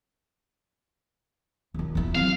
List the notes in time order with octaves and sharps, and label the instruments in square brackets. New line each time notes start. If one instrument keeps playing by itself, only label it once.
[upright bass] D#2 D#3
E2 E4
[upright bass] F#3 C4 [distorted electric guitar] F5